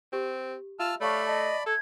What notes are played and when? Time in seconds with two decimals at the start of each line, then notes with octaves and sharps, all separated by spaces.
0.13 C4 G4
0.80 F4 E5 A5 E6 F6
1.01 A3 C#5 D5 F5 A5 B5 C#6
1.26 D#5 E5 A5
1.66 A4 G#6